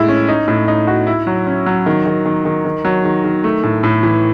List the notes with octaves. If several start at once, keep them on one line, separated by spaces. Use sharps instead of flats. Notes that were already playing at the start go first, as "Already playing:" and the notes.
Already playing: A2 G#3 E4
C#4
D#4
A2
D#4
F#4
E4
F#3
C#4
F#3
D#3
D#3
D#3
D#3
D#3
F#3
D#3
D#3
A3
A2
A2
E3